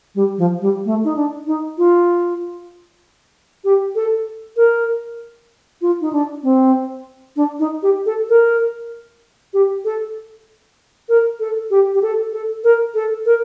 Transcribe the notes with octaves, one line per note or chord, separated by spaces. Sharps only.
G3
F3
G3
A3
D#4
D4
D#4
F4
G4
A4
A#4
F4
D#4
D4
C4
D4
D#4
G4
A4
A#4
G4
A4
A#4
A4
G4
G4
A4
A4
A#4
A4
A#4